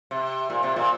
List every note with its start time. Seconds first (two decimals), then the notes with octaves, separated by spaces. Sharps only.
0.11 C3
0.50 A#2
0.63 C3
0.76 A#2